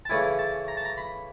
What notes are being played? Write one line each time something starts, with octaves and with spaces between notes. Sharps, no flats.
A5
C#3 E3 A3 C#4 E4 G#5
A5
A#5
A5
A#5
B5